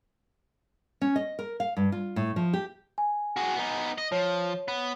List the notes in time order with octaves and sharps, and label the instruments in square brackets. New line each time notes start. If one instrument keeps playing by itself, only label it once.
[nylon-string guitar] C#4
D#5
A#4
F5
G2
F4
A2
F3
G4
[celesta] G#5
[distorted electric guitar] F#4 G#4
B3 D#4
D#5
[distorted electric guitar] F3 [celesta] C#5
[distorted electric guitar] B3